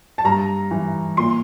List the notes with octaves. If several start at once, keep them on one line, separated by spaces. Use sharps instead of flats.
A5
G2 A#5
E3
A#2 C6